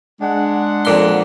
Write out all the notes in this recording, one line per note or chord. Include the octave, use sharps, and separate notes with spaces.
G#3 D4 F#5
F2 A#2 C6